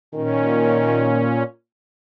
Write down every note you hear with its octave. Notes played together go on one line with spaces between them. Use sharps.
A#2 D#3 C#4